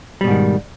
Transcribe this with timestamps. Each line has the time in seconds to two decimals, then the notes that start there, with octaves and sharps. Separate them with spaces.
0.21 G3
0.24 B2
0.27 G#2
0.31 D#3